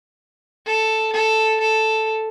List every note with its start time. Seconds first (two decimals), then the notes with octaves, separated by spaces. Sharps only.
0.67 A4
1.13 A4
1.60 A4